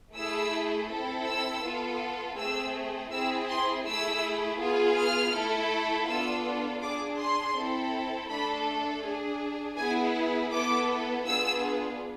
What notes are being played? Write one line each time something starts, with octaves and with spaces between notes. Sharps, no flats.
A3 E4 G#4 E6
C4 E4 A4
E6
B3 F4 A4
A3 C4 G#4 E6
C4 E4 G#4 E6
C6
A3 E4 G#4 E6
B3 F4 G#4
F6
A3 E4 A4
B3 D4 F4 A4 E6
D4 G#4 D6
C6
C4 E4 A4
A3 D4 A4 B5
D4 G#4
B3 E4 G#4 G#5
B3 E4 A4 D6
B3 D4 F4 G#4 E6